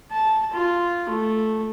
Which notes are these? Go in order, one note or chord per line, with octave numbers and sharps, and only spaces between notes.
A5
F4
A3